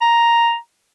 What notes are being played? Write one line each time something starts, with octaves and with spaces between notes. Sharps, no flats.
A#5